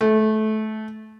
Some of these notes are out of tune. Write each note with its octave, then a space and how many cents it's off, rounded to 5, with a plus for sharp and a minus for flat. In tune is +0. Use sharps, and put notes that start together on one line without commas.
A3 -20